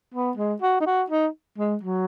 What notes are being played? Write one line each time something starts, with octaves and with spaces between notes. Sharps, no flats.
B3
G#3
F#4
D#4
F#4
D#4
G#3
F#3